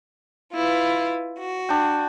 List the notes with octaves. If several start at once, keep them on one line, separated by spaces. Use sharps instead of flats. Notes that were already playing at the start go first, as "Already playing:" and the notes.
E4 F4 B4
F#4
D4 G5